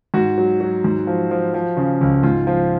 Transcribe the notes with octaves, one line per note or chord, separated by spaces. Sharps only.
G#2 F#4
F#3
F#3
G#2
F3
F3
F3
C#3
C#2
G#2 F4
F3 F4